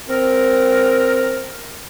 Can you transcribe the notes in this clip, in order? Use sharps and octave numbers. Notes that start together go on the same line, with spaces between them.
C4 A#4